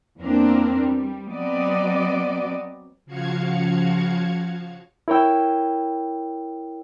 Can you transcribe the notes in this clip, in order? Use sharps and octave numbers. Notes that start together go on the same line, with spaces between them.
E2 A#3 C4 D4 A#4
G3
F#3 B3 C4 F#4 D5 D#5
C#3 F3 F#4 F5 G#6 C#7
E4 A#4 C#5 G5 E6